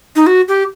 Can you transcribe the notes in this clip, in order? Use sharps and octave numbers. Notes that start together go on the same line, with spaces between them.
D#4
F#4
G4